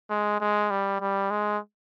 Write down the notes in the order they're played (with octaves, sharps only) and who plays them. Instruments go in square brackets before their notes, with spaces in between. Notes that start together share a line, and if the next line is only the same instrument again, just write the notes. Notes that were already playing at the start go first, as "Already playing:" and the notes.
[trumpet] G#3
G#3
G3
G3
G#3